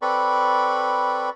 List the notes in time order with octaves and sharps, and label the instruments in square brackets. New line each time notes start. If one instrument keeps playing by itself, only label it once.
[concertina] C4 A4 B4 D5 B5 C#6